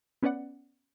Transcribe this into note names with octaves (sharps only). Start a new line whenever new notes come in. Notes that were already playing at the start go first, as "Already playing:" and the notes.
B3 C#4 B4 D5 F#5